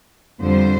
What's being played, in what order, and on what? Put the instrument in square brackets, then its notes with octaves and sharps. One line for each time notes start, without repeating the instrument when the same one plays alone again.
[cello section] F2 D3 G3 C5